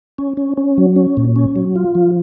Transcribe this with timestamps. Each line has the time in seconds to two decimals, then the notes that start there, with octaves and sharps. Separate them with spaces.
0.18 C#4
0.37 C#4
0.57 C#4
0.78 F#3
0.96 C#4
1.17 A#2
1.36 C#4
1.56 F#3
1.76 F4
1.95 F3